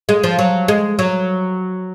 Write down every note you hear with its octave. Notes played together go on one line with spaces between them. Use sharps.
G#3
F3
F#3
G#3
F#3